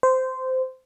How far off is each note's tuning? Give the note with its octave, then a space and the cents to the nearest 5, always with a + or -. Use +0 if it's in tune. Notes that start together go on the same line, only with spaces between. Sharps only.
C5 -15